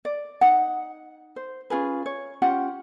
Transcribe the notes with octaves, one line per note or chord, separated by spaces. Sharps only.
D5
D#4 F#5
C5
C#4 F4 G#4 B4
C#5
C#4 F4 G4 F#5